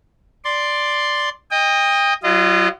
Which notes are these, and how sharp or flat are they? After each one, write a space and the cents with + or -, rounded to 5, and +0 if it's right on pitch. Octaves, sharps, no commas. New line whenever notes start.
D5 +0 C6 +0
D#5 +0 G5 +35
F#3 +25 F4 -30 D#5 -25